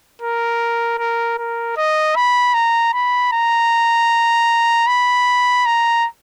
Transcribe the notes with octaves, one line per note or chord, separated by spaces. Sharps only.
A#4
A#4
A#4
D#5
B5
A#5
B5
A#5
B5
A#5